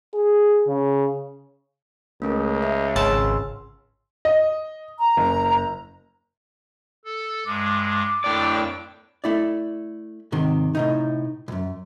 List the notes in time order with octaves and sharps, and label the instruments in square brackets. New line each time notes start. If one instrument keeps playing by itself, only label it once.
[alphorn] G#4
C#3
[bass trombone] C#2 [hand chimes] A3 C#4 A#4
[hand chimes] E5
[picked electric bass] G#1 [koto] C#3 A5 [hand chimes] C6 E6 F6
[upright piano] D#5
[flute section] A#5
[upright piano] F#1
[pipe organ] A4
[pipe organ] G2 G#3 [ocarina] D6
[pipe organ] F2 D4 G5 [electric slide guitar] A2 D5
[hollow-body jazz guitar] A3 E4 D5
G#2 C3 D#3
A2 C3 D#4
B1 F#2